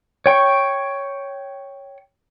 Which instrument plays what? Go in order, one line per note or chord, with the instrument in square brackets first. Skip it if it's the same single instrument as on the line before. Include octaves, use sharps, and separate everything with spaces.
[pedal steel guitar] C#5 G5 C#6